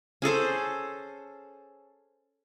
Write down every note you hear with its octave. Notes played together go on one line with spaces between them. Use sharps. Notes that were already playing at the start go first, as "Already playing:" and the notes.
C#4 G#4 A4 C5